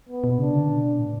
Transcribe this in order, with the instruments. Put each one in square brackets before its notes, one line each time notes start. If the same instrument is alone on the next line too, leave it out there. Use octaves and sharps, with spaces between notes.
[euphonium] B3
[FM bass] B2
[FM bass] C#3 [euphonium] D4
[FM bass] D3
B2
A2